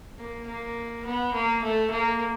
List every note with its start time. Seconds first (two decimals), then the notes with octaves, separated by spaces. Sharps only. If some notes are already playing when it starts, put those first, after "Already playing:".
0.19 A#3
0.47 A#3
1.05 B3
1.33 A#3
1.62 A3
1.91 A#3